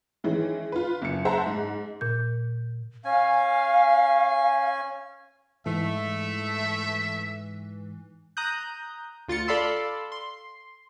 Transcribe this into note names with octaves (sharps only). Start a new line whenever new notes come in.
D#3 E3 G#3 C#4
F4 B4
F#1 C#7
C5 E5 F#5 A5 A#5
G#2
A#2 G6
C#4 F5 G#5
G#2 E3 A3 E5
A#5 D#6 F#6 G6
D2 F4 A6 C#7
A4 D5 F5 B5 C6 E6
C6